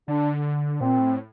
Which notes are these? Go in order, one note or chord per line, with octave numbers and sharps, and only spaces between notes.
D3 D4
A#2 C4
A2